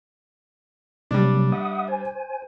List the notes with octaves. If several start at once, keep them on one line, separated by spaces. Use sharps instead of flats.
C3 F#3 G3 A#3 D4
E5 F#5 D#6
C5 G#5